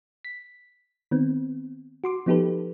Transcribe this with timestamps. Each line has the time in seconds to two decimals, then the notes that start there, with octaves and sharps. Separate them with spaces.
0.25 B6
1.11 D#3 B3 C4
2.04 F#4 C6 D6
2.26 F3 B3 D#4 G4 A4 B4